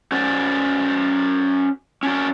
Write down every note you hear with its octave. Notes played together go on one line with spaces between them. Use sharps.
C#4 F#4 C5 D5
C#4 D4 F#4